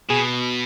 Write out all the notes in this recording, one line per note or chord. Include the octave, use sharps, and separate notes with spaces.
B2 G#4